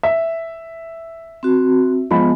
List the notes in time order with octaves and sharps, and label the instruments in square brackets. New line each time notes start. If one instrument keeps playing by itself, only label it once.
[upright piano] E5
[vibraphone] C4 F#4
[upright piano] F3 G#3 B5 [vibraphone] B3